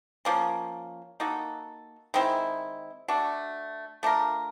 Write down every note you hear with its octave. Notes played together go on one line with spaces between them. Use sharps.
F3 A#3 C#4
A#3 D#4 F#4 A4
D#3 G#3 C4 E4
A3 D4 F#4
A3 D4 F4 A#4